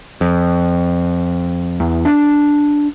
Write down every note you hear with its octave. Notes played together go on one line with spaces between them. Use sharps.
F2
E2
D4